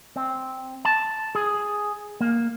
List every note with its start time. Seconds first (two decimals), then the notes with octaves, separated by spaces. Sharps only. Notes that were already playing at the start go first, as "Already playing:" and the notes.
0.16 C4
0.85 A5
1.35 G#4
2.21 A#3